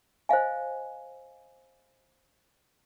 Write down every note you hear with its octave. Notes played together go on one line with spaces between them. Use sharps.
C5 D#5 F5 G#5